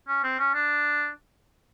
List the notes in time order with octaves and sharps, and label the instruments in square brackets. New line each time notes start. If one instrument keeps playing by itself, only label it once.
[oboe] C#4
C4
C#4
D4